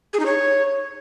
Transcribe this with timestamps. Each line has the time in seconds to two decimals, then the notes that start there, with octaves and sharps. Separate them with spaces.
0.13 G#4
0.20 D#4
0.26 C#5